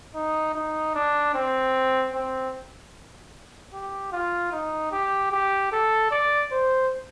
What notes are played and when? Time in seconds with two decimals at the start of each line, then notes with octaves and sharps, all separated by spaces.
0.14 D#4
0.54 D#4
0.95 D4
1.34 C4
2.13 C4
3.74 G4
4.12 F4
4.52 D#4
4.92 G4
5.32 G4
5.72 A4
6.11 D5
6.52 C5